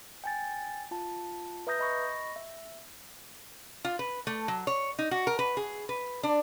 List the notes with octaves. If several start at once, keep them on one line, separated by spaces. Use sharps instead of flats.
G5 G#5 A6
F4 A5
B4 E5 A#5 D#6 G6 A#6
D#5 B5 C#6 A#6
E5
F4
B4
A3
F#3
C#5
D#4
F#4
A#4
B4
G#4
B4
D4